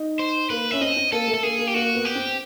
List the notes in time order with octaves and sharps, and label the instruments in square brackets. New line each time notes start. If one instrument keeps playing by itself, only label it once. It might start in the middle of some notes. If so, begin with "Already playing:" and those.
Already playing: [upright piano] D#4
[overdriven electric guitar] C5
[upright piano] A#3 [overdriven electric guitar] B4
[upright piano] C#4 [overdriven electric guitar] E5
[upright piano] C4 [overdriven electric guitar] D#5
[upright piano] C4
[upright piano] A#3 [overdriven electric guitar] A4
[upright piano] A3
[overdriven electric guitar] A4
[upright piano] A#3 [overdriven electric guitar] G#4
[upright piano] A#3
[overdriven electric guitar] G4
[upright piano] A#3 [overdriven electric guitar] F#4
[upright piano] B3
[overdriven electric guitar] G4
[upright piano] C4